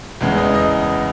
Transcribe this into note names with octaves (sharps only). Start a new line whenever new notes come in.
E2 C#3 E3 G#3
D#5 D#6
D#5 D#6